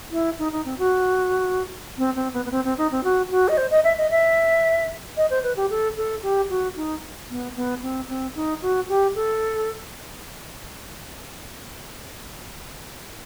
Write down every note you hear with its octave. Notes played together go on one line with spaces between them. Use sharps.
E4
D#4
D#4
C4
F#4
C4
C4
B3
B3
C4
C4
D#4
C4
F#4
F#4
D#5
C5
D#5
E5
D#5
E5
D#5
C5
B4
G4
A4
A4
G4
F#4
D#4
B3
B3
C4
C4
D#4
F#4
G4
A4